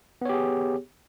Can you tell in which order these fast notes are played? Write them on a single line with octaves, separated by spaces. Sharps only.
B3 C#5 G4 G#4